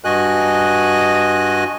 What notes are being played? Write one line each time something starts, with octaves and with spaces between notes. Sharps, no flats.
G2 F#4 D#5 G#5 F#6